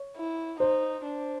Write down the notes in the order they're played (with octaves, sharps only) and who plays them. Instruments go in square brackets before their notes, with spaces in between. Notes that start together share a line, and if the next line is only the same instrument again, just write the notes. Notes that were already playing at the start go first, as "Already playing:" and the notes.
Already playing: [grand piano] C#5
[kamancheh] E4
[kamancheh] D#4 [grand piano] C5
[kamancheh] D4